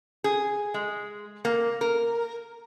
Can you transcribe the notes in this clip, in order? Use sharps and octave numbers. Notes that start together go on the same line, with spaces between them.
G#4
G#3
A#3
A#4